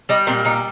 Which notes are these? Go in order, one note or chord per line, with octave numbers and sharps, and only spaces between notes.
G3 D#4
A#2 C4
G3 D#4